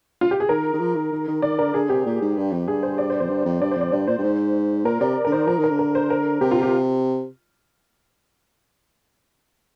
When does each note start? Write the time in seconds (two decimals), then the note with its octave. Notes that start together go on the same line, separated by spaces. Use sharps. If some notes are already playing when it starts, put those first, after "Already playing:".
0.21 F4
0.31 G4
0.40 G#4
0.49 D#3 A#4
0.73 D#3
0.80 F3
0.96 D#3
1.12 D#3
1.28 D#3
1.42 D#3 D5
1.59 D3 A#4
1.74 D3 G#4
1.89 C3 G4
2.06 A#2
2.21 G#2
2.37 G2
2.52 F2
2.68 G2 G#4
2.83 C5
2.98 D5
3.10 C5
3.20 F2 C5
3.29 G2
3.45 F2
3.61 G2 D5
3.71 F2 C5
3.81 D5
3.92 G2 D5
4.07 A#2 C5
4.18 G2
4.23 G#2
4.85 A#2 A#4
5.01 C3 D5
5.25 D3 A#4
5.32 D#3 C5
5.47 F3 A#4
5.58 D#3
5.64 A#4
5.69 D3
5.79 A#4
5.95 C5
6.10 A#4
6.41 C3 G4
6.51 F4
6.62 G4